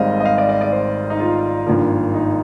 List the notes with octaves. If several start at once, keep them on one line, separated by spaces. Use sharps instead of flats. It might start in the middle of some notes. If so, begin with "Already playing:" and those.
Already playing: G#1 G#2 G3 C4 D#5 F5
D#5
F5
D5
D5
D5
C5
D#4
F4
G#1 G2 F3 A#3
D#4